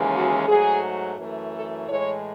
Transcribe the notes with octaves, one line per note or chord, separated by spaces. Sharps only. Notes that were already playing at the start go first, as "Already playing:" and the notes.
Already playing: D#2 C#3 E3 G#3
F#4
G#2 F#3 A3 G#4
F#2 E3 A3
A4
A2 E3 G#3 C#5